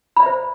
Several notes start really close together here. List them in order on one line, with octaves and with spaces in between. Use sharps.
B5 D5 E5 C5